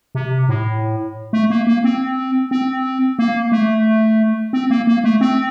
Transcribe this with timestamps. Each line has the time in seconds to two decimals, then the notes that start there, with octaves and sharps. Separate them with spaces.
0.15 C3
0.49 A2
1.33 A3
1.50 A#3
1.67 A#3
1.84 C4
2.51 C4
3.19 A#3
3.52 A3
4.53 C4
4.70 A#3
4.87 A#3
5.04 A3
5.21 C4